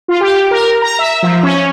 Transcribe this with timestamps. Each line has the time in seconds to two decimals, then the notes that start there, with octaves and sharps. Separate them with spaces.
0.08 F4
0.21 G4
0.51 A#4
0.82 A#5
0.99 E5
1.23 F3
1.43 C#4